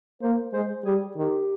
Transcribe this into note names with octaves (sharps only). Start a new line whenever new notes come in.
A#3 C5
G#3 C5
G3 G#4
D#3 G4